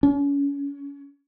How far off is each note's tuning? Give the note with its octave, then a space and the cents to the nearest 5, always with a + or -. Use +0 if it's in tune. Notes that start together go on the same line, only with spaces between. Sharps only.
C#4 +30